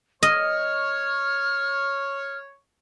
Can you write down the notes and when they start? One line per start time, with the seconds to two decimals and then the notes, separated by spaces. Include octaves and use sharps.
0.23 C#5 D#5 F6